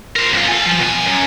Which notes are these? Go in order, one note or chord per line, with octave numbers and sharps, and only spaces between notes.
A#4 C5
F#2 F4
A4 G#5
F3
B2 G#5
F#2 F#3